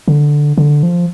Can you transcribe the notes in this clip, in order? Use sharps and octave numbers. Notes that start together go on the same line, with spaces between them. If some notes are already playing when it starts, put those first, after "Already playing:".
D3
D3
F3